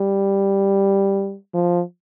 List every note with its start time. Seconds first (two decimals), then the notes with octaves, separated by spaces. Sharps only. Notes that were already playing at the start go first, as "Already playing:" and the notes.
Already playing: G3
1.54 F3